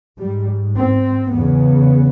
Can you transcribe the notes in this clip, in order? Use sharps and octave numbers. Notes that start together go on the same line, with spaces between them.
G#2 G3
C4
E2 C#3 B3